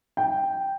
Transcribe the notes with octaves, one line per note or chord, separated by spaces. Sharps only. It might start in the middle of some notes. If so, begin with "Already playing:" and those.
G5